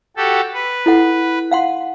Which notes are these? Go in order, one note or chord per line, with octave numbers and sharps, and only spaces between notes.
F#4 G4 A4
B4
E4 A4 F#5
F5 F#5 C6